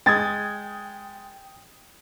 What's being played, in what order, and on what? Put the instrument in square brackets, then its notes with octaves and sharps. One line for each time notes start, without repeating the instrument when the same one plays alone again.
[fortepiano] G#3 [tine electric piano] G5 [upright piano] D#6 G#6 A6